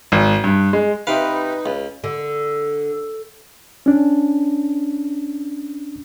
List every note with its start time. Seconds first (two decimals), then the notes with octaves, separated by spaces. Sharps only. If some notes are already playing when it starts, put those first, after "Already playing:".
0.12 G#1
0.44 G2
0.73 G#3
1.07 C3 D#4 B4 F5
1.66 C#2
2.04 D3
3.86 C#4 D4